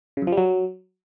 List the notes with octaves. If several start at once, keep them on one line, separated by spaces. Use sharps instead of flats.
C#3
F#2
F3
G3
F#3